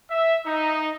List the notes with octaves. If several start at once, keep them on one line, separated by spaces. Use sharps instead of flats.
E5
D#4